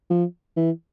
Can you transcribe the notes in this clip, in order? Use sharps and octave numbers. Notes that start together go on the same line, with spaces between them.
F3
E3